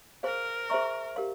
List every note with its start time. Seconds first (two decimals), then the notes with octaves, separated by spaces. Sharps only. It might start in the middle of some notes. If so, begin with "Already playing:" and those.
0.23 G#4 A#4 C5 F5 G#5 C6
0.70 G#4 C5 E5 A#5 C#6
1.16 G4 A#4 F5 C6